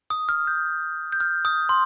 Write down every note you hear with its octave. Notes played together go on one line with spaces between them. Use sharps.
D#6
F6
G6
G6
F6
D#6
C6